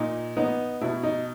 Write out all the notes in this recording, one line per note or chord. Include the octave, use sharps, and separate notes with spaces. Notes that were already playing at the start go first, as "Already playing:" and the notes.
Already playing: A#2 D#4
B3 D#4
B2 E4
D#4